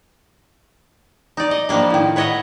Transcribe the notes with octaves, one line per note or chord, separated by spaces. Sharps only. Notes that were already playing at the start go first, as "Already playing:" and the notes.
D#4 D5
D#5
F3 G3 A#3 D4
A2 D#3
B4 C#5 D#5 E5 F#5